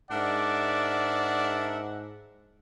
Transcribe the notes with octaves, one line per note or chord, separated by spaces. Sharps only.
G#2 D4 A#4 D5 E5 F#5